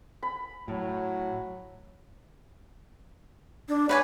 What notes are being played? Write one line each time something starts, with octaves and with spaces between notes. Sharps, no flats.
B5
A2 F#3
D4
B4 C#5 F#5 G#5